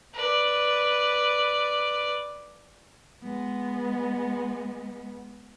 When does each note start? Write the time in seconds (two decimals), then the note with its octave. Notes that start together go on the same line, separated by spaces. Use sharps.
0.14 B4 D5
3.23 G#3 B3